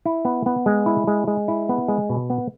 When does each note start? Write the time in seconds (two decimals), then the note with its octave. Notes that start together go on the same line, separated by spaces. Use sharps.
0.06 E4
0.25 B3
0.46 B3
0.66 G#3
0.86 E4
1.07 G#3
1.28 G#3
1.48 E4
1.69 B3
1.88 G#3
2.10 B2
2.30 B3